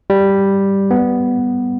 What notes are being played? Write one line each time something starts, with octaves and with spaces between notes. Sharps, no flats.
G3
B3